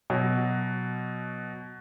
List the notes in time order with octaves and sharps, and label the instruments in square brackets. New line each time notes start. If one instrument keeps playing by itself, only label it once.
[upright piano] B2 F#3